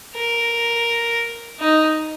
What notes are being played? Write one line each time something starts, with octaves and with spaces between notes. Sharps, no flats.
A#4
D#4